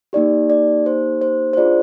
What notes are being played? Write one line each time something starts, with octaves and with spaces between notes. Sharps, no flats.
A#3 D#4 G4 D5
D5
C5
C5
C5
D4 F4 G#4 D5